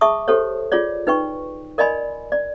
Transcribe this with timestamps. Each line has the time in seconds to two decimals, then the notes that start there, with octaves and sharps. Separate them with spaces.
0.01 G#4 E5 A5 C#6 D#6
0.28 G4 A4 C5 C#5
0.72 F4 G#4 C#5 D5
1.07 D#4 B4 G5 C#6
1.78 A#4 D5 D#5 G#5 B5 C6
2.32 D5